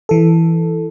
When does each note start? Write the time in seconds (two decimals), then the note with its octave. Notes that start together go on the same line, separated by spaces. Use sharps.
0.09 E3 A4